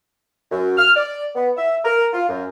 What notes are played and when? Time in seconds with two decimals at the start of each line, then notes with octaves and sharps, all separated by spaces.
0.51 F#2
0.77 F6
0.96 D5
1.35 B3
1.57 E5
1.85 A#4
2.13 F4
2.29 F#2